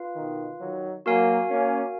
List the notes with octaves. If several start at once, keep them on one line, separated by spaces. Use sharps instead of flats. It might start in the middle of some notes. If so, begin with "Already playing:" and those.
Already playing: F4 B4 F5
B2 D#3
D#3 F#3
F#3 A#3 F#4 A#4 F5 G#5
A#3 C#4